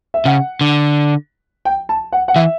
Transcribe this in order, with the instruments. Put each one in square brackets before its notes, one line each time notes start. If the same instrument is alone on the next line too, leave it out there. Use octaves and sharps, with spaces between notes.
[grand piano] E5
[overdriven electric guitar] C#3 [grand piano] F#5
[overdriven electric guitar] D3
[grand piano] G5
A5
F#5
F#5
[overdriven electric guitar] E3 [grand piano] E5